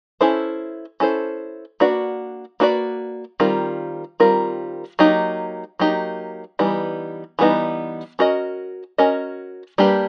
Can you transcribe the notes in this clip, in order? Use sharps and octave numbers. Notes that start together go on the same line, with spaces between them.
C#4 E4 A4 C5
C#4 E4 A4 C5
A#3 D4 F#4 B4 D5
A#3 D4 F#4 B4 D5
D#3 G3 C4 F4 A#4
D#3 G3 C4 F4 A#4
F#3 A#3 D#4 G4
F#3 A#3 D#4 G4
E3 G3 B3 D#4
E3 G3 B3 D#4
C#4 F#4 A#4 D#5
C#4 F#4 A#4 D#5
G3 A#3 D4 G4 B4